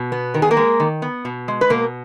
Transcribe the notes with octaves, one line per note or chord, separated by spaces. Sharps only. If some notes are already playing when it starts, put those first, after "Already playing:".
Already playing: B2
B3
D#3 A#4
G#4
A#3 A#4
G#3
D#3
B3
B2
G#3
B4
B2 A#3 A#4